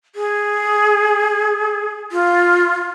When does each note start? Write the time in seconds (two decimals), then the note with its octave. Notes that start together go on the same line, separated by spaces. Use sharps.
0.15 G#4
2.12 F4